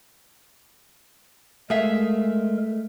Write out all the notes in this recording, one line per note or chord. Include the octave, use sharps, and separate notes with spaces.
G#3 A3 G#4 A#4 E5 F5